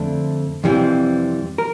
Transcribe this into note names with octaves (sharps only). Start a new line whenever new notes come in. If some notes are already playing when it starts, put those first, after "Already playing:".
Already playing: F2 D3 A3 D4
F2 C3 E3 G3
A#4